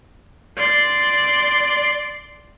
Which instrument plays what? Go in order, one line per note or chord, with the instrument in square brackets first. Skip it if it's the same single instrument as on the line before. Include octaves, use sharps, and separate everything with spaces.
[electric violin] D5 C6